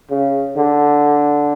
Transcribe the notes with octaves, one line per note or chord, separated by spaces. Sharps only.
C#3
D3